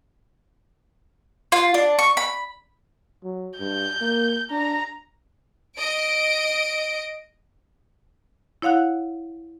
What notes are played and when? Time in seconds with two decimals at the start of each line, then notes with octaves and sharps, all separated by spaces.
1.52 F4
1.74 D4
1.99 C#6
2.17 B5
3.24 F#3
3.59 G2 G6
4.01 A#3
4.51 D4 A#5
5.77 D#5 D7
8.62 E4 C#5 F5 F#5 F#6